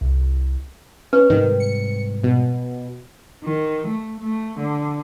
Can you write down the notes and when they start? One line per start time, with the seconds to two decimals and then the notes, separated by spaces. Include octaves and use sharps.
0.01 C2
1.13 C#4 B4
1.30 G#2 C3 D#3 G3
1.60 C#7
2.24 B2
3.44 D#3
3.87 A3
4.20 A3
4.59 D3